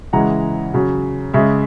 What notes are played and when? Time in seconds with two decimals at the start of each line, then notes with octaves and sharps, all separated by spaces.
0.13 C#3 E3 G#3 F#5 A#5
0.73 C#3 F#3
1.34 C#3 G#3 E5